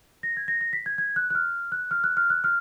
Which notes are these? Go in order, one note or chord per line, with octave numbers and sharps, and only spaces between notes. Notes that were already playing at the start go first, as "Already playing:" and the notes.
A#6
G#6
A#6
A#6
B6
G#6
G#6
F#6
F#6
F6
F#6
F6
F#6
F6
F#6
F6